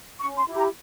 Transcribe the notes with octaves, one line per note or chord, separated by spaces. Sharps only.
C#4 C#6
C6
E4 G4
A#5